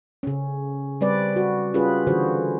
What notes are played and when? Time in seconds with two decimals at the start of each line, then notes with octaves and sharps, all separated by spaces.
0.23 C#3 C#4
1.01 G3 C4 B4 D5
1.36 F#4
1.74 C#4 F4 G4 G#4 B4
2.07 D3 E3 F#4 G#4 C5